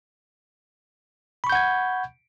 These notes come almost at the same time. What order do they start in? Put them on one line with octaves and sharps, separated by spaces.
B5 C#6 G6 F#5 G#6